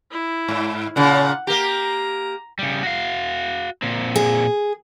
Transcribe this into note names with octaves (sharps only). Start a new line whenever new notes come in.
E4
G#2
A#2 C#3 F#5
A#3 G4 A#5
C#3 G3
F#4 F5
A#2 C4
G#4